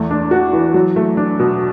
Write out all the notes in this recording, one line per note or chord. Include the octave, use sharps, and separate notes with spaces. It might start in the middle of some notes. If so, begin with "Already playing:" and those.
Already playing: E2 A3
D4
F#4
E3
F#3
A3
D4
B2